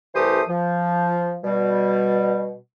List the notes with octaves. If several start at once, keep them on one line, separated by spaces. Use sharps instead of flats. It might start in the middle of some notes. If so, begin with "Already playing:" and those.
C2 E3 A3 G4 C5 D#6
F3
B2 G3